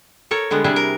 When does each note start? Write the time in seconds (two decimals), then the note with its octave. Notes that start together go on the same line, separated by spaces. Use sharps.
0.31 A4 A#4 C#5
0.51 D3 G3 G#3 B3
0.64 C3 G3 D4 E4 G#4 A#4
0.76 A#4